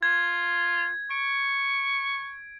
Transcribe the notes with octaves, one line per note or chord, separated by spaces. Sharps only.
F4 G#6
C#6 D7